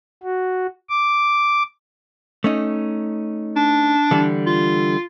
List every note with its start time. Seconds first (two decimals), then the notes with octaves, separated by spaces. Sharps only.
0.23 F#4
0.90 D6
2.44 A3 C#4 D#4
3.56 D4
4.11 D3 E3 G3
4.46 F4